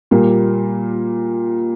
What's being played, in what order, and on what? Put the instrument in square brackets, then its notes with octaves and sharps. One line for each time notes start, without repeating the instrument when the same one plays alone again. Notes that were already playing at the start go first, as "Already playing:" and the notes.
[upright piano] A#2 G3 A#3